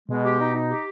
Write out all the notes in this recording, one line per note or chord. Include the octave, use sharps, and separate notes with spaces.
B2 G#3
G4
D#4
D#4
G4